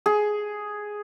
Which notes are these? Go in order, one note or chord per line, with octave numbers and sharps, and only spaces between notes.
G#4